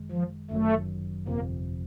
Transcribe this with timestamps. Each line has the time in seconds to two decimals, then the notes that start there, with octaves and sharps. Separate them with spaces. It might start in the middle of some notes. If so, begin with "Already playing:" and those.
Already playing: G#1 F#2 D#3 G#3
0.12 F3
0.50 G1 F#2 D#3 F#3 A3
1.27 G1 F2 C3 F3 A#3